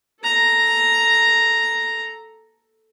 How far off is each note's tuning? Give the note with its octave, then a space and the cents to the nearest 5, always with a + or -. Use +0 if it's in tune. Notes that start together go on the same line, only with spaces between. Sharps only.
A4 +0 A#5 +0